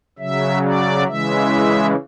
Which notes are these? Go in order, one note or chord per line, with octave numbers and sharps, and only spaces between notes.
C#3 F#3 E5
D5
C#3 E3 G#3 E5